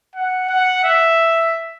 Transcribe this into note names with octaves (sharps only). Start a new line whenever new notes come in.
F#5
F#5
E5